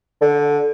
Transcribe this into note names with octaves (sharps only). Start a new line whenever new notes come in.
D3